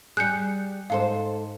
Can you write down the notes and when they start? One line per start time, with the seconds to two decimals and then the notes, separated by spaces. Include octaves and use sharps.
0.17 G3 G#4 F#6 G6 C#7
0.90 G#2 A4 C5 F5